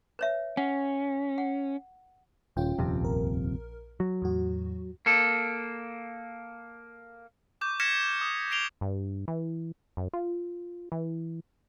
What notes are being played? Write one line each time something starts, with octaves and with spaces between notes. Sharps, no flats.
B4 C#5 E5
C#4 F#5
F#5
D#1 C#4 F4 G5
D#1 F2 C3
A#1 A#4
F#3
E2 A2 F#4
A#3 A4
C#6 D6 G6
F6 G#6 A#6 B6 C#7 E7
D#6
A#6 C7 D7 F7 G7
G2
E3
F#2
F4
E3